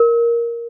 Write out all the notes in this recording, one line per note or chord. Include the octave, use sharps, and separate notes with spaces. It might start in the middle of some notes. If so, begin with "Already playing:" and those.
Already playing: A#4